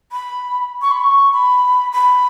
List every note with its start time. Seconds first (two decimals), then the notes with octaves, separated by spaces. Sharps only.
0.12 B5
0.82 C#6
0.92 B5
1.01 C#6
1.33 B5
1.92 B5